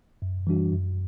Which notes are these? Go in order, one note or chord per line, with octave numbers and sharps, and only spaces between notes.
F#2
E3 G3 D4 F#4
F#2